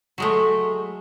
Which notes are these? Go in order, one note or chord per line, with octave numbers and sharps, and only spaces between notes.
F#3 G#3 A3